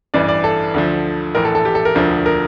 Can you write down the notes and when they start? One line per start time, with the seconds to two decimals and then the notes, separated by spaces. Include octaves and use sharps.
0.14 A1 G2 E3 D5
0.29 D5
0.44 A4
0.74 D2 D3 F3
1.35 A#1 A2 E3 A#4
1.45 A4
1.55 A4
1.65 G4
1.75 A4
1.85 A#4
1.95 E1 D2 D3 F3
2.26 A#4